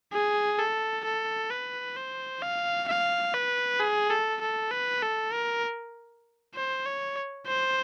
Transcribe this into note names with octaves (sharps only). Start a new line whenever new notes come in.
G#4
A4
A4
B4
C5
F5
F5
B4
G#4
A4
A4
B4
A4
A#4
C5
C#5
C5